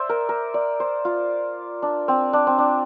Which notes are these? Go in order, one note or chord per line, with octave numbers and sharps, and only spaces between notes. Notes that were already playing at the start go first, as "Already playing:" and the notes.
Already playing: C5 D5 E5
A#4
A#4
D5
C5
F4
D4
C4
D4
C4
D4